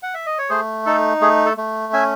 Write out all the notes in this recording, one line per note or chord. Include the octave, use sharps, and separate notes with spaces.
F#5
E5
D#5
C#5
A3 G#4 C5
D#4 A4
A3 G#4
A4
A3
C#4 E5 G#5